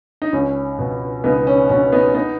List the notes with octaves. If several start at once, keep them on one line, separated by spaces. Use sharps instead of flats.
D#4
C#2 C#4
B2
C#2 B3 D#4
C#4
B2 C#4
B3 D#4
B3 D#4